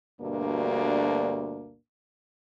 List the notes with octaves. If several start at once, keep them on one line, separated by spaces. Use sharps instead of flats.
D2 G2 B2 A#3 D4